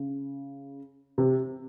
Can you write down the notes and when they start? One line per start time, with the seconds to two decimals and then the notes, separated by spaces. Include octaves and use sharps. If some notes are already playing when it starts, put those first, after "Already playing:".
Already playing: C#3
1.18 C3